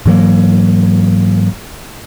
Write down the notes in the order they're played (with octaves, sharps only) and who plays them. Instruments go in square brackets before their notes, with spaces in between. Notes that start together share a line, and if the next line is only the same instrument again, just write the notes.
[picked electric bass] G#2 E3 F#3 A#3